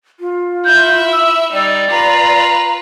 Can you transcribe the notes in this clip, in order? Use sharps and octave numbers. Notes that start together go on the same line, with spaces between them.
F4
E4 E5 G6
E6
G3 D#4 D5
F4 B4 A#5